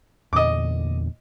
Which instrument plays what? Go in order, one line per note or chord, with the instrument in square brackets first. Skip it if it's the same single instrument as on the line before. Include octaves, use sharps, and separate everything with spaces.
[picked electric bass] E2 A#2 D3 [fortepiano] D#5 D6